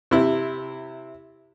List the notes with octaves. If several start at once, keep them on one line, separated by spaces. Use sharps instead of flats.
C3 E4